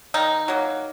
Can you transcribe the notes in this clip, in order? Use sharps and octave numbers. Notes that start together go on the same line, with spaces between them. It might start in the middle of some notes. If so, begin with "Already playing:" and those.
D#3 D#4
F#3 A#3